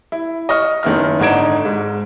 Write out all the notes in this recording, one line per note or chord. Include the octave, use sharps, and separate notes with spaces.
E4
D#5 C#6 F6
F#1 D#3 B3 E4 F6
G#1 D3 D#4 G#6 D7 E7
G#2